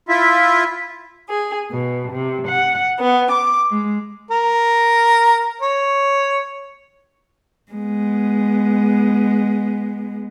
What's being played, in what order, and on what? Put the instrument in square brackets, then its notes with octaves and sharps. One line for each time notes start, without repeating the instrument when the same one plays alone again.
[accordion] E4 F4 E5
[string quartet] G#4
B2
C3
F#5
B3
D6
G#3
[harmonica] A#4
C#5
[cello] G#3 B3